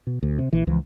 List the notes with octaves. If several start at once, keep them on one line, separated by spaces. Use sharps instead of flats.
B2
D2
C3
A#1 E3
C#2 E3 F3